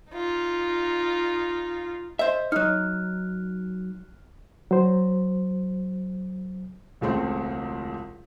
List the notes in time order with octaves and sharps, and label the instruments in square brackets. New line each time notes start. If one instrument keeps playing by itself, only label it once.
[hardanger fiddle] D#4 F4
[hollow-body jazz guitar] C5 E5 [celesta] D#5
[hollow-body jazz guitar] F#3 D#4 [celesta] F6 F#6
[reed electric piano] F#3 C5
[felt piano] E1 C#2 C#3 A3 C4 C6